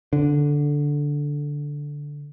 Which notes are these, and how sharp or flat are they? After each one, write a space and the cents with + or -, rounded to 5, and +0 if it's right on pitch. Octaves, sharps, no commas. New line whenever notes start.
D3 -5